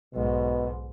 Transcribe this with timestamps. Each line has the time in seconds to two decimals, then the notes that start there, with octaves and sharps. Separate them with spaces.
0.14 B1 G#2 B2